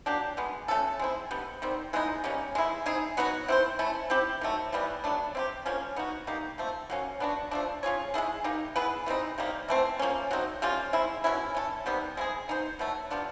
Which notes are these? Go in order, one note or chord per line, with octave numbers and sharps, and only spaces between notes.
F#3 A#3 D4 G4
B2 G#3 B3
A3 C#4 F#4 A4
G#3 C4 E4
D3 G3 B3
D#3 G3 C4
E3 G#3 B3 D#4
G3 A#3 C#4
G#3 B3 E4
C4 D#4 G#4
F#3 B3 D#4 F#4
C4 E4 G4 C5
A3 C#4 E4
C4 E4 G4
D#3 F#3 A3
C3 E3 G3 B3
F#3 A3 D4
C4 E4 G4
D3 F3 A#3 C#4
B3 D#4 F#4
G3 A#3 D#4 G4
F3 A3 C4
F#3 A#3 C#4
B3 D4 F#4
F3 A3 D4
C#4 F4 G#4 C#5
G#3 B3 E4 G#4
A#3 D#4 G4
B3 E4 G#4 B4
E3 G3 C4 D#4
C3 D#3 G3 A#3
E3 A3 C4
F3 A#3 C#4
F#3 A3 C4 D#4
G3 A#3 C#4 F4
G#3 C4 E4
B2 G#3 C#4 E4
C#4 E4 A4
C3 D#3 G3 B3
G#3 C4 E4 G#4
B3 D#4 G4 C5
B2 F#3 A3
G3 B3 D4 F4